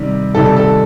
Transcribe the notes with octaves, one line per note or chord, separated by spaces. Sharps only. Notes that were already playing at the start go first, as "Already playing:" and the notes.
Already playing: C3 D#3 G3
C3 D#3 G3 A4
A4